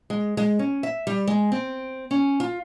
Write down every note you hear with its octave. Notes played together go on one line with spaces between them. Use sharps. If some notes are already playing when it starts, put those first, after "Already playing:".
G#3
G#3
C#4
E5
G3
G#3
C4
C#4
F4